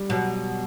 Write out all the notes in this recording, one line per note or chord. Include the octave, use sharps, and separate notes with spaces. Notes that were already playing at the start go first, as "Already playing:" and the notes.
Already playing: G3
B2 F#3